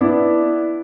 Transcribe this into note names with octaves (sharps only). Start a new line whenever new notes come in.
B3 D4 E4